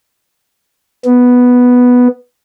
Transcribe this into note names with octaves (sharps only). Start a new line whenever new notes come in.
B3